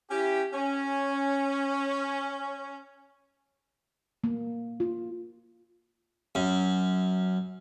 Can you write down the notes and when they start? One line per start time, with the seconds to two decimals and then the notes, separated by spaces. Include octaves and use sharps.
0.10 C#4 E4 G4
0.53 C#4
4.24 A#3
4.80 F4
6.35 F#2